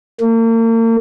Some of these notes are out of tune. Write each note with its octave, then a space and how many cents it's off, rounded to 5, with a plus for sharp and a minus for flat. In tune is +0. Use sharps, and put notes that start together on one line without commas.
A#3 -40